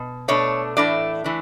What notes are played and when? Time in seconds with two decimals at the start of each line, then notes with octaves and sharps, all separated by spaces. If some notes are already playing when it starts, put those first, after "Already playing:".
Already playing: B2
0.28 B2 A3 D4 C#5
0.77 A2 E3 A3 D4 D5
1.24 E3 A3 D4